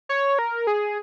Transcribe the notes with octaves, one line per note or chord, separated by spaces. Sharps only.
C#5
A#4
G#4